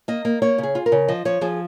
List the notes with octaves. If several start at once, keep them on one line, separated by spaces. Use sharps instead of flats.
A#3 D#5
A#3
A#3 C#5
C#3
G#4
F4
A#4
C#3
F3 D#5
F3 C#5
F3 G#4